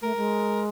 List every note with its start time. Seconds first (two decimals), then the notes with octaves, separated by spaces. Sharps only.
0.02 A3 A#4
0.16 G#3